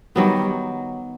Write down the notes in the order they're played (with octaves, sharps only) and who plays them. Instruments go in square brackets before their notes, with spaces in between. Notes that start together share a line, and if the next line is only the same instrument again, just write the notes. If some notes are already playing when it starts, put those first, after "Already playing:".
[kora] D#3 F#3 B3 [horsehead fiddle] G3